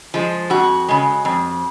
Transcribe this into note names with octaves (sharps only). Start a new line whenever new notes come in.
F3 G#3
F2 F#4
C#3 G#3
F2